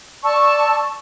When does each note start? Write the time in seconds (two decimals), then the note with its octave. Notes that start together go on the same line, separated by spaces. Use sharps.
0.24 D5 A5 C#6 E6